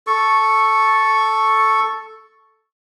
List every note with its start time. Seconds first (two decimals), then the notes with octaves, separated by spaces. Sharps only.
0.07 A4 C#6